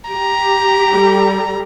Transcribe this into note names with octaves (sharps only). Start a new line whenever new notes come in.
G4 A#5
G3 A4